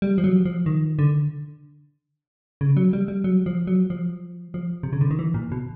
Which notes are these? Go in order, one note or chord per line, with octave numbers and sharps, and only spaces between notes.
G3
F3
F#3
F3
D#3
D3
C#3
F#3
G3
G3
F#3
F3
F#3
F3
F3
C3
C#3
D3
D#3
E3
A#2
B2